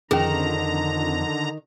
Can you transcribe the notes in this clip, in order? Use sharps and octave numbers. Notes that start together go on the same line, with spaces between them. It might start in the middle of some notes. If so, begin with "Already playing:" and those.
F2 D3 D#3 C#4 G#4 A#5